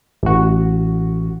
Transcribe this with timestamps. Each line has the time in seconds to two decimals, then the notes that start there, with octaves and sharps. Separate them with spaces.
0.23 A1 F#4